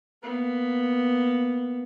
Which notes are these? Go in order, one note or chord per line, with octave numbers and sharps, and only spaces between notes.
A#3 B3